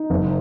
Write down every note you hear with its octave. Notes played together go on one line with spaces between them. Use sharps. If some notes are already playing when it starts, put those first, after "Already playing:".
Already playing: D#4
F#1